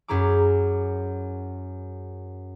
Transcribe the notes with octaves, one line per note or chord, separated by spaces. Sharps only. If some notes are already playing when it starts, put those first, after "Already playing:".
F#2 E4 G#4 A#5 D6